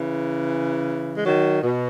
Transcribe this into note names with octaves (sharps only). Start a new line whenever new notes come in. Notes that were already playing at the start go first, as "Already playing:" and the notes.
Already playing: C#3 E3
G#3
D#3 F#3
B2